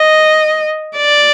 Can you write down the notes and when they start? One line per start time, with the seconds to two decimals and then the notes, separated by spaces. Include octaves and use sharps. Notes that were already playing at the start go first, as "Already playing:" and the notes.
Already playing: D#5
0.96 D5